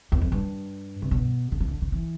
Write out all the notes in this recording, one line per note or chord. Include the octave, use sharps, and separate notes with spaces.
E2
F2
G2
C3
B2
D3
E3
D3
D3
E3